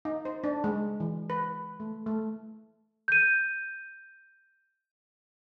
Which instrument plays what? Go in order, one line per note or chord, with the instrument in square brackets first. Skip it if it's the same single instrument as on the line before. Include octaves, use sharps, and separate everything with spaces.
[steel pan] D#4
C5
D4
G#3
E3
B4
A3
A3
[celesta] G6 D#7